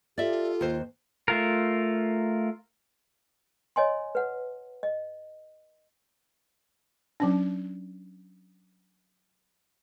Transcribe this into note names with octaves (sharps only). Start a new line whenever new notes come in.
F4 G4 A4 D5 E5
D#2 C5
A3 F4 A#4
C#5 D#5 G#5 C6
B4 F#5
D#5
F#3 C#4 D4